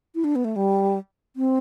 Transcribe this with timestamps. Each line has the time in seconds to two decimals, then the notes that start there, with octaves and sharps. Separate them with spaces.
0.15 E4
0.24 D4
0.36 B3
0.45 A3
0.56 G3
1.36 C4